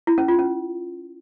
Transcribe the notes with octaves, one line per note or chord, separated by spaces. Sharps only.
E4
C#4
F4
C#4